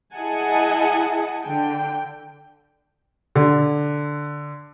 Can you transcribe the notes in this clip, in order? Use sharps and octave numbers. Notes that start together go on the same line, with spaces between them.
E4 G#4 D#5 F#5 G#5 A5
D3 G5
D3